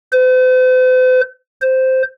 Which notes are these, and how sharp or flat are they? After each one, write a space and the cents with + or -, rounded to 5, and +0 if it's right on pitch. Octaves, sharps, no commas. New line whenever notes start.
C5 -45
C5 -5